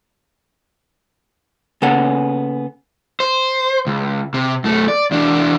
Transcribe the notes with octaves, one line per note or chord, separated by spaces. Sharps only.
C#3 A#3 B3 C#4 A4 F#5
C5
C#2
C3
F#2 A3
D5
E2 D4